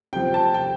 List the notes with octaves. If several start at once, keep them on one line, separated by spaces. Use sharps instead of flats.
C3 F3 G5
A5
G5